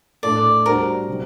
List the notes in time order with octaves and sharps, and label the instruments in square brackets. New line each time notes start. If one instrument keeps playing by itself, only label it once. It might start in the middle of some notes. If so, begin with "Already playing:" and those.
[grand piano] A2 A3 D4 A4 [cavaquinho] D5
[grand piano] G3 D4 F#4 C5 [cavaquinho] A#4
[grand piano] C3 F#3 C4